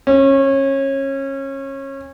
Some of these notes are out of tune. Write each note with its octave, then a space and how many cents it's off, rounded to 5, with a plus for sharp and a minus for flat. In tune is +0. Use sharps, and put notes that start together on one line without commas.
C#4 -25